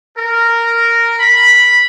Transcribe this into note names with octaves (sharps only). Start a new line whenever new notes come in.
A#4
B5